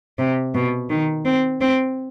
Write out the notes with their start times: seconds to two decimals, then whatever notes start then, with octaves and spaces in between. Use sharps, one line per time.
0.19 C3
0.55 B2
0.90 D#3
1.26 C4
1.61 C4